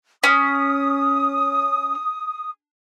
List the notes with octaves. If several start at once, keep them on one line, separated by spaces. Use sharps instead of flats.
C#4 D#6